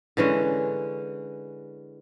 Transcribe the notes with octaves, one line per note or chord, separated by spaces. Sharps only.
D3 E3 G#3 C#4